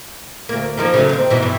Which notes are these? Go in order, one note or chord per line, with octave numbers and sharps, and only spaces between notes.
D2 A#3
D#3 F3 A#3
C#3 F#3 A3
D#2 C4
G#2 B2 E3
G2 E3